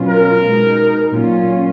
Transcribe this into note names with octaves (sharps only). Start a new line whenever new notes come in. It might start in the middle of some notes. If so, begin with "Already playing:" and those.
Already playing: B2 F#3 C#4 F4
A#4
B2 G#3 D#4
A#2 F#3 C#4 F4